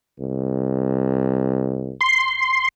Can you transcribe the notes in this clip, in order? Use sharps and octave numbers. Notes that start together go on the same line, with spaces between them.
C2
C6